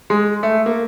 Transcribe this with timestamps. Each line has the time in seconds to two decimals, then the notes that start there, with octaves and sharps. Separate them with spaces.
0.10 G#3
0.43 A3
0.66 A#3